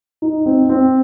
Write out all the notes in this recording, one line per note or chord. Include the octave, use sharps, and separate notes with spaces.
D#4
C4
C4